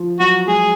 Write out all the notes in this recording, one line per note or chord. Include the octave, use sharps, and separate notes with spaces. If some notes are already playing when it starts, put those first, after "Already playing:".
Already playing: F3
F#3 F#4
G#3 G#4